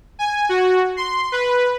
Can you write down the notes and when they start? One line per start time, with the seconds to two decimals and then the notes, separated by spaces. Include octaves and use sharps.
0.19 G#5
0.49 F#4
0.97 C6
1.32 B4